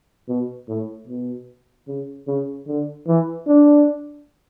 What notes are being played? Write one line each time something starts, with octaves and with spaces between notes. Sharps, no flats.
B2
A2
B2
C#3
C#3
D3
E3
D4